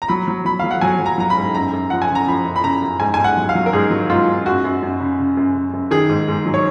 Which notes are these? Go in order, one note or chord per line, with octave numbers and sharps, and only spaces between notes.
A#5
F#3 B5
F#3
F#3 B5
F#3 F5
F#5
F#3 G#5
F#3
A#5
F#3 A#5
B5
G#2
F#2 A#5
F#2
F3 F#5
G#5
C#3
A#5
F3 B5
F#2
B5
C#3 A#5
F#2
G#2 G#5
G#2 G#5
F#5
F#3
F5
F#3
A#4
G#2 G#4
F#3
G#2 F4
G#2
F#2 F#4
F#2
F#2
C#3
C#3
F#2
C#3
F#2
D#3 G#4
G#2
G#2
F#3
C#5